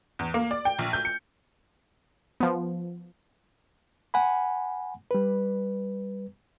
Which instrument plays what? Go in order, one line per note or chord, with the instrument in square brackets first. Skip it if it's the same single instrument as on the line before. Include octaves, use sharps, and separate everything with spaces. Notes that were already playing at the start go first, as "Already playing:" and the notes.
[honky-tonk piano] E2
A#3
D5
G5
A#1
G6
C#7
[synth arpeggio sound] F3 B3
[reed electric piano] F#5 G#5 B5
G3 B4